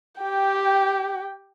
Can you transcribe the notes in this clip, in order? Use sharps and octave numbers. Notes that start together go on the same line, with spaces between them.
G4 G5